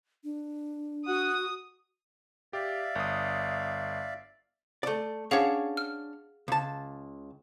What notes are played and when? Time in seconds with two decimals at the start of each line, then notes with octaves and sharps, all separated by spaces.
0.24 D4
1.07 F#4 F#5 D#6
2.53 G4 D5 E5 F5
2.95 G1 D#6
4.83 A3 D5
5.31 C#4 D4 G#4 C#5 F5 F#5
5.77 F6
6.48 C#2 A5